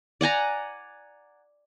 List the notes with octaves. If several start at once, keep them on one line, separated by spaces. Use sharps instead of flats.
D5 F#5 G#5 A#5